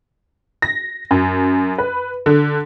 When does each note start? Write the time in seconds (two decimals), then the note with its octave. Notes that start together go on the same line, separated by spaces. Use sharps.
0.62 A#6
1.11 F#2
1.78 B4
2.26 D3